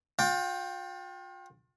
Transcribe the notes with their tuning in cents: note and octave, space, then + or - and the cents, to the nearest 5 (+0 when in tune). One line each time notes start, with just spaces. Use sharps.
F4 +40 G5 +0